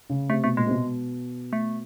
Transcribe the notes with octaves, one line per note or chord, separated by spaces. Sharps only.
C#3
C3 A3
B2 A3
A#2 G#3
C3
B2
A3